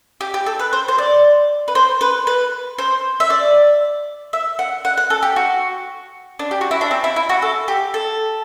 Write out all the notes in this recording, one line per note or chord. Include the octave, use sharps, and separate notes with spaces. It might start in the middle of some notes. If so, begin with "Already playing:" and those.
G4
G4
A4
B4
C5
C5
D5
B4
C5
B4
B4
C5
E5
D5
E5
F#5
F#5
F#5
A4
G4
F#4
D4
G4
F#4
E4
D4
C4
E4
E4
F#4
A4
G4
A4